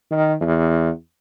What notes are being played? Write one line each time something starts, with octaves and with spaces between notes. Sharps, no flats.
D#3
E2